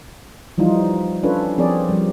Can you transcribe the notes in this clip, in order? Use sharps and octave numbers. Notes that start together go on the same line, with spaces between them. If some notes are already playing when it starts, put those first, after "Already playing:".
E3 F3 G3 D#4 F4
C#4 D4 F4 A4 B4 C#5
F3 C4 G#4 A#4 C#5 D5
F3 G3